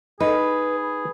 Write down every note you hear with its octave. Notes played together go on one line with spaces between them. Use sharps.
D#4 G#4 B4